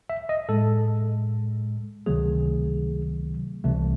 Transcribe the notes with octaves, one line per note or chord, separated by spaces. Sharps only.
E5
D#5
A2 G#3 A4
C#2 C3 D#3 F#3 A3 G#4
C2 C3 E3 A3